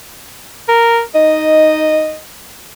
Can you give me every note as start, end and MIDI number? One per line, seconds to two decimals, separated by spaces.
0.68 1.01 70
1.15 2.13 63
1.15 2.18 75